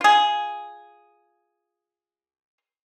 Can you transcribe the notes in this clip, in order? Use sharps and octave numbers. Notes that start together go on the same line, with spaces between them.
F4 G#4